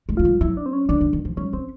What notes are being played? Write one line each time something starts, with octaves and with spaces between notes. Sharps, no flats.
G#3
F#3 F4
G3
F#3 E4
D4
C4
C#4
D3 D4
D3
D#3
F3
G3 C#4
C4 C#4